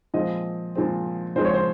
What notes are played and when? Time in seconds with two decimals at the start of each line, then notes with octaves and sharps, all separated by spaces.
0.14 A#2 F3 G#3 C4 D#5
0.76 A#2 F3 G#3 C4
1.36 A#2 F3 G#3 C4 C5
1.45 C#5
1.54 C5